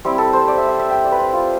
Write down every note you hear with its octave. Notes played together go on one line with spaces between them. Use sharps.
G3 C4 E4 G4
A4
C5
D5
E5
E5
E5
G5
D5
B4
C5
F4